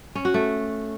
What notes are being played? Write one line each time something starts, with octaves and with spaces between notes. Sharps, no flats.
C#4
F#4
A3